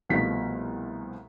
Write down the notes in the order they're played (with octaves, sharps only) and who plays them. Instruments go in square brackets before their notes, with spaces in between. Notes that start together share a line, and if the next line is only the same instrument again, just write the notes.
[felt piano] C2 B2 F3 A3 B6